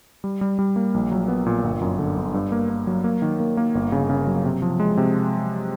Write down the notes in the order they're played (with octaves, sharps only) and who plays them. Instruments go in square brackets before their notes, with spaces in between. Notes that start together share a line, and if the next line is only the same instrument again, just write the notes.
[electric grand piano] G3
G3
G3
A#3
A#1
F#3
B3
A#2
G1
F#2
D3
G1
G2
A#3
A#3
F#3
A#3
D#3
A#3
A#3
G1
C#3
C#3
F#3
C3
F3
G#3
C3